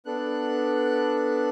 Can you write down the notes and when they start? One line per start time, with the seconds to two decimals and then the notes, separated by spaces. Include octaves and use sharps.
0.05 B3 D4 A4 F#6